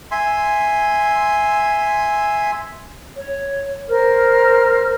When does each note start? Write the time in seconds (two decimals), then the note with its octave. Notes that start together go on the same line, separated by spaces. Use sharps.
0.11 E5 G#5 C6
3.15 C#5
3.89 A#4 C5 F6